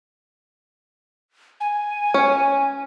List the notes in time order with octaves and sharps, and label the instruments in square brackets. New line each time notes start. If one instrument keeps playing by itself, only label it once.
[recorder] G#5
[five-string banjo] C#4